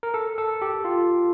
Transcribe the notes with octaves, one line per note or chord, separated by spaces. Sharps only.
A#4
A4
A4
G4
F4